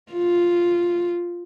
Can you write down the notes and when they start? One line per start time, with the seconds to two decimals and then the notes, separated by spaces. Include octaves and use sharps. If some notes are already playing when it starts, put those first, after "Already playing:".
0.12 F4